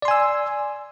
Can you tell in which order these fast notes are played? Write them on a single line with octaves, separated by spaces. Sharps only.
D5 C6 G#5 E6